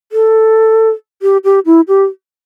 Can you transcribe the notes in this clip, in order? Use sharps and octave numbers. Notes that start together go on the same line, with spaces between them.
A4
G4
G4
E4
G4